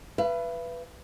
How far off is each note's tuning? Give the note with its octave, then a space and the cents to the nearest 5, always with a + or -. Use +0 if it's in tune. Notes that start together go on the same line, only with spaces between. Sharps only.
B4 +0 E5 +45